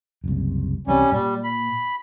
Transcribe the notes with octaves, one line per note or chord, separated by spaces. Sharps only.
F#1 C2
C2 E3 G3 C4 C#4
A#2 G3
B5